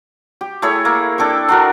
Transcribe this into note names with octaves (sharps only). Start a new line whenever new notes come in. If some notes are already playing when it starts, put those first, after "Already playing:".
G4
A3 E4 G#4 C#5
A#3
D4 A4 G5 C#6
D4 F#4 A#4